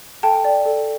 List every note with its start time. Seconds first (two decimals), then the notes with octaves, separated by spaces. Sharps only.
0.23 A4 G5 A5
0.45 D5 G5
0.66 A4